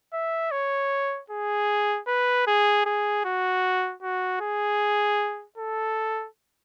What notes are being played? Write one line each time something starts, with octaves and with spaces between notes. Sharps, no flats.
E5
C#5
G#4
B4
G#4
G#4
F#4
F#4
G#4
A4